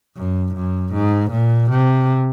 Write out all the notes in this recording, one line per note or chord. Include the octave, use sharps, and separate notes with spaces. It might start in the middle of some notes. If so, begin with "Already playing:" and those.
F#2
F#2
G#2
A#2
C3